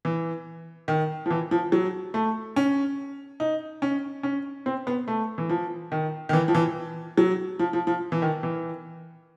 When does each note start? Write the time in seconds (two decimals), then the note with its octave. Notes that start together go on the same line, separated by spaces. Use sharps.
0.05 E3
0.88 D#3
1.26 F3
1.30 E3
1.51 F3
1.72 F#3
2.14 A3
2.56 C#4
3.40 D#4
3.82 C#4
4.23 C#4
4.66 C4
4.87 B3
5.08 A3
5.38 E3
5.49 F3
5.92 D#3
6.29 D#3
6.33 E3
6.48 F3
6.55 E3
7.17 F#3
7.59 F3
7.73 F3
7.87 F3
8.12 E3
8.22 D#3
8.43 E3